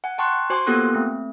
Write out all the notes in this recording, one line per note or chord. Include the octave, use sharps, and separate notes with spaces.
F#5 G#5
G5 A5 C6 C#6 F#6
F#4 C5 G#5 C6 D6
A#3 B3 F4 G4 A4 F#6
A3 C4